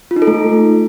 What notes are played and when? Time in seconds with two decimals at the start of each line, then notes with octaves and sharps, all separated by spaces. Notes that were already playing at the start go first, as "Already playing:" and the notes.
0.11 F4
0.16 D#4
0.22 A4
0.27 A3